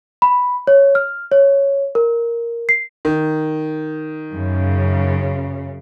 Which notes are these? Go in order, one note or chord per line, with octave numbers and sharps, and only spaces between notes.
B5
C#5
F6
C#5
A#4
C7
D#3
F#2 C#3